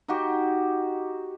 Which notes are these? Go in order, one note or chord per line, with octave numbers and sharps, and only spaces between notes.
D#4 F#4 G4